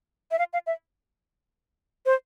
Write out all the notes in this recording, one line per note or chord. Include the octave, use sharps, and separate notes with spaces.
E5
F5
F5
E5
C5